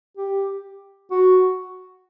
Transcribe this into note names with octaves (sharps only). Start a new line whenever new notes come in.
G4
F#4